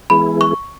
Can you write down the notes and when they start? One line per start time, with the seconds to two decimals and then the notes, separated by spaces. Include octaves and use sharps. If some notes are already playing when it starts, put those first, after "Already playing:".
0.10 E3 G#3 B3 E4 G#4 B5
0.41 C#6